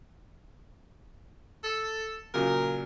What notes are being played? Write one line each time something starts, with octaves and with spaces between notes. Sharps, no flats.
A4
A#2 C#3 F#3 A#4